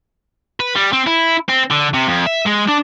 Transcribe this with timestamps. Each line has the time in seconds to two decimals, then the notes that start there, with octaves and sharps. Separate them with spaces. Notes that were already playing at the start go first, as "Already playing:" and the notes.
0.60 B4
0.75 G3
0.93 C4
1.07 E4
1.49 C4
1.71 D3
1.94 C3
2.07 F2
2.26 E5
2.46 G#3
2.68 D4